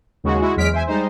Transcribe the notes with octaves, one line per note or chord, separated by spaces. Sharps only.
D#2 C#3 G#3 F#4
G#3 E4 F#4
E2 F#3 G#3 F6 B6 D7
E2 C5 E5 G#5
G3 G#3 D#4 C5